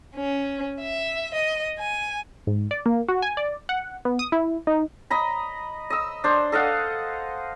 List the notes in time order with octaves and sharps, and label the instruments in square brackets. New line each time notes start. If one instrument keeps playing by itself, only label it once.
[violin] C#4
E5
D#5
G#5
[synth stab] G#2
D5
A#3
F#4
G#5
D5
F#5
B3
D#6
E4
D#4
[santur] D#5 A#5 B5
D#5 E6
D4 C5
A4 D#5 F5 F#5